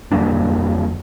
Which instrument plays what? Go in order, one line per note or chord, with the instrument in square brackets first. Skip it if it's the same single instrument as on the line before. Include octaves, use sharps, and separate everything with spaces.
[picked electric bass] F2 G3 A#3 D4